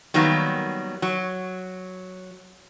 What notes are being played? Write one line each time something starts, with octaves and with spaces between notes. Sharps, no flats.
D#3 F#3 G3 A#3 B3
F#3